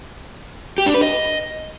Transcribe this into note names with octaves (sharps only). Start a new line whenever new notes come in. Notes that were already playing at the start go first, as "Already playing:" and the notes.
G4
D4
B4
D#5